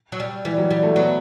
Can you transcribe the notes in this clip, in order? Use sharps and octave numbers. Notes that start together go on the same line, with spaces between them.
F#3
G3
E3 G3
F#3
G3
A3
F#3 B3